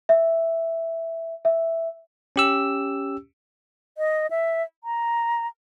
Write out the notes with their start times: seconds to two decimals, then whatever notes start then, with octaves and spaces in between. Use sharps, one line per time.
0.09 E5
1.45 E5
2.36 C#4 G4 E6
3.98 D#5
4.31 E5
4.84 A#5